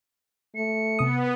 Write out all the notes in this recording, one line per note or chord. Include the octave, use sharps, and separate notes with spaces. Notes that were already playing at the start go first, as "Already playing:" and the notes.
A3 C#7
C3 B3 D#6